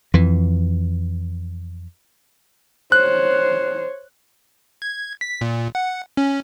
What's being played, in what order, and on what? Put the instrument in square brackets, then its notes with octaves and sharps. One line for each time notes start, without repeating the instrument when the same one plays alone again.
[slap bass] F2 E3
[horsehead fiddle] C5 C#5 [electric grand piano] F#6
[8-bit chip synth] G#6
B6
A#2
F#5
C#4